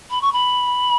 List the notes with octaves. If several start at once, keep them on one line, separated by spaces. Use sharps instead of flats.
B5
C#6
B5